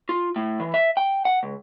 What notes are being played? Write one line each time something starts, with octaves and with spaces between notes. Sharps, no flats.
F4
A2
E3
E5
G5
F#5
C#2